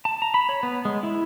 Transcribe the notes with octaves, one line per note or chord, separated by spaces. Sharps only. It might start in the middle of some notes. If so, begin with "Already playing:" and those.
A5
A#5
B5
C#5
B3
G#3
E4